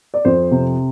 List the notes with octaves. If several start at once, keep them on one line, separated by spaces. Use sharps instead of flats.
D5
F2 C5
C3